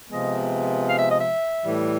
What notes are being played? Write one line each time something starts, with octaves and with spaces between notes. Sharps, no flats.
C3 F3 G#3 B3 D#5
F5
E5
D#5
E5
A2 E3 G3